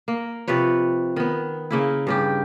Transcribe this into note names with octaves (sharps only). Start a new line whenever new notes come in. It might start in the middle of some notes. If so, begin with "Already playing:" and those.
A#3
C3 F3 B4 C#5
D#3 B3
C#3 A#3 E4
G2 C#3 G4